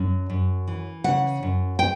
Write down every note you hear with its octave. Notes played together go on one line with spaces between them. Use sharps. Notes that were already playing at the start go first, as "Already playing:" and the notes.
Already playing: F#2
F#2
E3
C#3 F#5
F#2
G5